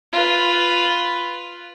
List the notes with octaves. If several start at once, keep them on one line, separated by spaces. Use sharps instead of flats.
F4 B4